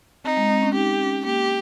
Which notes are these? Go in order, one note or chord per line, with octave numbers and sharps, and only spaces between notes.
C4 D#4
G#3
C4
C#4
D#4 G4
C#4
A#3 G4